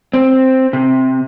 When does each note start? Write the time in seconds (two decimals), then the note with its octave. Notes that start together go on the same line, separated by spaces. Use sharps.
0.14 C4
0.73 C3